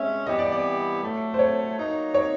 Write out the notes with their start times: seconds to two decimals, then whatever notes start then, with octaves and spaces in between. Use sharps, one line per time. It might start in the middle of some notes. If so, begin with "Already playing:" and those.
Already playing: G#3 C#4 E5
0.27 E3 G3 B3 E4 G4 D#5
0.39 D5
0.52 D5
1.02 A2 F#3 A3
1.34 C5
1.39 C#5
1.77 F#3 A#3 D#4
2.14 C#5